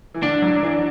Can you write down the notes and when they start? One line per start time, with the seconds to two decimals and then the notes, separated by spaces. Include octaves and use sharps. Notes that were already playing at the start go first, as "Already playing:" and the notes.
0.14 E3
0.23 D3 D4
0.42 F#3
0.63 E3